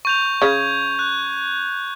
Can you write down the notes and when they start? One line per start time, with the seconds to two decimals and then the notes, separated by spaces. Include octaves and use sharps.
0.05 C#6 G6 F7
0.42 C#3 G#6
0.99 F#6